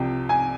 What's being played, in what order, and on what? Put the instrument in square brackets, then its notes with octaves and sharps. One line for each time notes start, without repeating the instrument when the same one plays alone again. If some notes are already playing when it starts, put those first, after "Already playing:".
Already playing: [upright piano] C2 C3 F3 G5
G#5